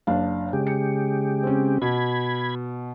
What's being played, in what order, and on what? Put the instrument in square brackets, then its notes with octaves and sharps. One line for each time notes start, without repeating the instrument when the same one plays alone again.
[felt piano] F#1 D4 F5
[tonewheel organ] C#3 G#3 G4
[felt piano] C#7
C4 C#4
[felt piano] B2 [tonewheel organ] B5 G#6